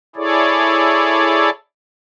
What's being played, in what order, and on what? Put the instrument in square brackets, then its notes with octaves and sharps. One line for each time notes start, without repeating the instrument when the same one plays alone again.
[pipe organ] E4 G#4 A4 C#5 D5